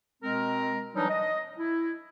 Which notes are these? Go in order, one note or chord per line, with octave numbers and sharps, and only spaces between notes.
B2 G#3 C4 A#4
E3 F#3 G3 D4 D#4
D#5
E4